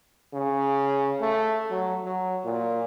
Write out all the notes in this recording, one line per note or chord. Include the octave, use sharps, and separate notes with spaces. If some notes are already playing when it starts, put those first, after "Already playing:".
C#3
A3
F#3
F#3
A#2